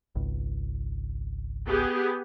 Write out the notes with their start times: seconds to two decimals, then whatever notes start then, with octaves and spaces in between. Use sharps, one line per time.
0.15 G#1 C#2
1.67 B3 G4 G#4